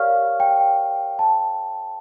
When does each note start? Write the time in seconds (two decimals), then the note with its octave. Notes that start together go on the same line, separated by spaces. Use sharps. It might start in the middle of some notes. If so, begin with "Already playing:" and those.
Already playing: G4 A#4 C#5 D5 F5 C#6 F6
0.40 G5
1.19 A5